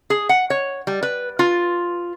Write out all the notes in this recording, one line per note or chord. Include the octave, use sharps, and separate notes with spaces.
G#4
F#5
C#5
G3
B4
F4